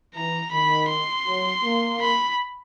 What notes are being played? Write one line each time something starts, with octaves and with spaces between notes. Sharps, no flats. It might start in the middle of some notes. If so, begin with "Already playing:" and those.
E3 A#5
D#3 B5
C6
F#3
A#3
B5